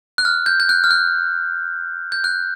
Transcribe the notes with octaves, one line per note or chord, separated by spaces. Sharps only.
F#6
F6
G6
G6
F#6
F6
F#6
G6
F#6